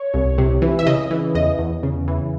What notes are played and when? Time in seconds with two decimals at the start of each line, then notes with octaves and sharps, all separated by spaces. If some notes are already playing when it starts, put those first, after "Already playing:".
Already playing: C#5
0.14 C2
0.38 C3
0.62 E3
0.79 E5
0.86 C#3 D#5
1.11 E3
1.35 E2 D#5
1.59 E2
1.83 C#3
2.08 E3